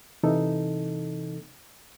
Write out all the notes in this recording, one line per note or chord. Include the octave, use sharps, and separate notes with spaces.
C3 E3 D#4 A4